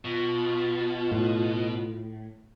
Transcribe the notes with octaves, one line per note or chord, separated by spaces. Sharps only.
B2 F4
A2